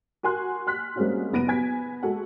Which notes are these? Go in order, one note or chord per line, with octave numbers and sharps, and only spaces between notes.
F#4 A#4 G#5 C6 F#6
C6 F6 F#6 B6
G3 G#3 A#3 C4 C#4 F#4
F#1 B3 A#6 D7 D#7
B3 G#5 G#6 B6
G#3 F#4 A4 F#5